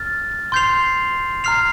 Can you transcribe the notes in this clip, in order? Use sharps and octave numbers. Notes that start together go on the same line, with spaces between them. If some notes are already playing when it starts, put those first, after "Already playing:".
Already playing: F6 A6
C6 G6 C7 F7
A#5 F6 C7 F7